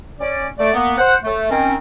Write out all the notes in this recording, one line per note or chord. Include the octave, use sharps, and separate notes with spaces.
C#4 D5
A3 D5
A#3 B3
C5 F#5
A3
D#3 C4 C#4